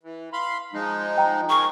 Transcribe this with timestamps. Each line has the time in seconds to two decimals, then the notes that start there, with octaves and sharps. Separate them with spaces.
0.03 E3
0.33 F5 B5 C6
0.73 F3 G#3 D#4
1.18 G5 A#5
1.50 G#4 A#4 C#6